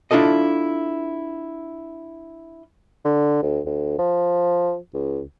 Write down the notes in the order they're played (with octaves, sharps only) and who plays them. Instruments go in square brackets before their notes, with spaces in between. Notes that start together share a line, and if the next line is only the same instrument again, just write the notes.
[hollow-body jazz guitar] D4 E4 F4 A4 D#5
[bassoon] D3
D2
D2
F3
C#2